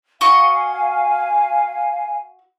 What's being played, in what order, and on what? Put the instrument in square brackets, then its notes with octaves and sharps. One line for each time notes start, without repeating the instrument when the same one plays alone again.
[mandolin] F#4 D#5 C#6 [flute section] F5 G#5